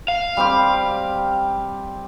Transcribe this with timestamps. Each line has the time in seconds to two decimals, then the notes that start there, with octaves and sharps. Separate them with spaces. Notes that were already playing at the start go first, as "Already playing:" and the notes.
0.08 F5
0.37 G3 C4 G4